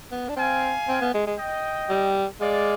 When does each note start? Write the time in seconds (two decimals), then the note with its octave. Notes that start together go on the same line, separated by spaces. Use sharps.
0.12 B3
0.29 D4
0.37 C4 F5 G#5
0.88 C4
1.01 B3
1.14 G#3
1.27 G#3
1.38 D#5 G5
1.90 G3
2.40 G#3 D5 F5